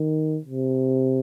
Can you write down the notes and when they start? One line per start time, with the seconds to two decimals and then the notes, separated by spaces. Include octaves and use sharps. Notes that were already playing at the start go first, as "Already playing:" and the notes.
Already playing: D#3
0.45 C3